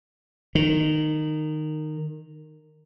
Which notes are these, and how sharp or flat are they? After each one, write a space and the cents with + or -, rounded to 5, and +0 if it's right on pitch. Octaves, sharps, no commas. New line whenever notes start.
D#3 -15